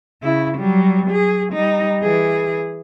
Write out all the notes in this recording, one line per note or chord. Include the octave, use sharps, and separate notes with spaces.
C#3 E4
F#3 G3
F#3 G#4
G3 D#4
E3 G#4